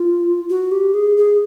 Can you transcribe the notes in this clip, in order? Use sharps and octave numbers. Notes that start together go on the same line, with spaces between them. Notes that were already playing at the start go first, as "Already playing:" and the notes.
Already playing: F4
F#4
G4
G#4
G#4